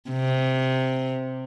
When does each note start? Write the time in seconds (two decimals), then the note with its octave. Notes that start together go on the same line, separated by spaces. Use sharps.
0.11 C3